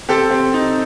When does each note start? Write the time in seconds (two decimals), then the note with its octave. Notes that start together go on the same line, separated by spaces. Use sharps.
0.09 C4 G4 A4
0.31 C4
0.54 D#4